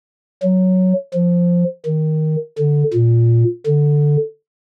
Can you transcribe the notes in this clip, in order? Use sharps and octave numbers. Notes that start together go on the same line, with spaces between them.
F#3
F3
D#3
D3
A#2
D3